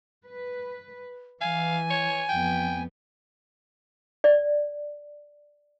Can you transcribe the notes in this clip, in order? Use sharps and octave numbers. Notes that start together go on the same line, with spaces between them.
B4
E3 F5 G#5
C#5
F2 B3 G5
D5